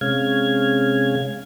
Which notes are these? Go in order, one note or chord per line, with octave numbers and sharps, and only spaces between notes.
C3 G#3 C#4 F5 G#6